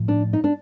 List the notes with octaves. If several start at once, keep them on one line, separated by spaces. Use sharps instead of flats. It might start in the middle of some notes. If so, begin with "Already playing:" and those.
Already playing: A2 F3 A3
D4
D#4
D4